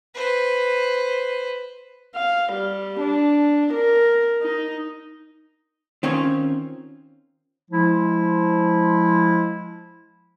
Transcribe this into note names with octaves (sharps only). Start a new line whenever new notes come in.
B4 C5
F5
G3
D4
A#4
D#4
D#3 C4 C#4 F4 C#5
F3 G#3 E4